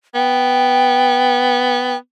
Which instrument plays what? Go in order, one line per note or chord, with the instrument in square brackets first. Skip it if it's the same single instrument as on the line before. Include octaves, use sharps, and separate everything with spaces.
[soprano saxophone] B3 [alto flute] G5